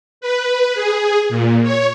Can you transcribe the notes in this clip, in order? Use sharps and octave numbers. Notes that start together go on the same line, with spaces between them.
B4
G#4
A#2
C#5